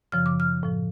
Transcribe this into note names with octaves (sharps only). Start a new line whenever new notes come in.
F#2 C#3 F3 F6
D6
F6
A2 F3